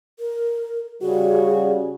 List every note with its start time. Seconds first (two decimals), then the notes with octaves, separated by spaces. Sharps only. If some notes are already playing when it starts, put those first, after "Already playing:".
0.19 A#4
1.02 C#3 G3 F#4 G#4